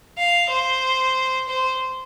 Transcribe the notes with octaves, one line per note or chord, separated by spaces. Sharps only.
F5
C5
C5